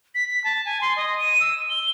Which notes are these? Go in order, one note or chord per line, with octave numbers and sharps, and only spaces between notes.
B6
B6
A5
G#5
C6
D#5
D#7
E6
G7